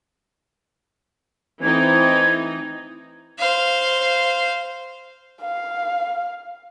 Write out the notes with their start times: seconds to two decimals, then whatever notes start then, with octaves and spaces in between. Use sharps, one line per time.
1.62 E3 A3 C4 D#4 G#6
3.38 C5 F5
5.42 F5